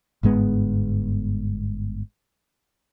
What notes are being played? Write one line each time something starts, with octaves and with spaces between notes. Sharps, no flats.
G1 G#2 G#3 B3